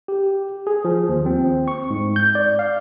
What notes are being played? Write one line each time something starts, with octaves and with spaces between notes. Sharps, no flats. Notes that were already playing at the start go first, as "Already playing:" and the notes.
G4
G#4
F3
D#2
C4
C#6
G#2
G6
D5
F5